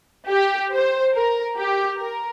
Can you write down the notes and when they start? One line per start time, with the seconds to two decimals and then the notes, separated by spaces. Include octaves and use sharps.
0.29 G4
0.71 C5
1.13 A#4
1.56 G4
1.98 A#4